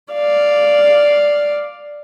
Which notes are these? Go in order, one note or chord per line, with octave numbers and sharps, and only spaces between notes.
D5 F5